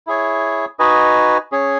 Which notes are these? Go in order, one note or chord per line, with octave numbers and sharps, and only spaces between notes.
E4 G#4 C#5
D#4 F#4 B4 D#5 G#5
C#4 G#4 C#5